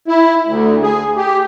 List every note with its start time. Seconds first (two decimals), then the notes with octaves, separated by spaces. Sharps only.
0.08 E4
0.47 D2
0.82 G#4
1.17 G4